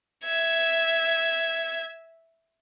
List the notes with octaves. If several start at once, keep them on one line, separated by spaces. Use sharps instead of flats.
E5 G#6